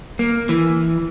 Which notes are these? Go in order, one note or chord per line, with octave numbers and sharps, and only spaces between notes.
A#3
E3